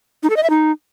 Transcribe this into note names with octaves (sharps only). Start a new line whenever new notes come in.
D#4
A4
D#5
E5
D#4